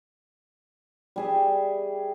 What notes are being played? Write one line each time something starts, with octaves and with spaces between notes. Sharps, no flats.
G3 G#4 E5